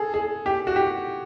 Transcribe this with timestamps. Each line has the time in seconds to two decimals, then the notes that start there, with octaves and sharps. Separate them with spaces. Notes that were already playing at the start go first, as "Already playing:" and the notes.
Already playing: G#4 A4
0.14 G#4
0.46 G4
0.67 F#4
0.76 G4